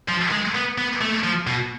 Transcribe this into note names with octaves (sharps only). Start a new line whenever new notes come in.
F3
G#3
B3
B3
A3
F3
B2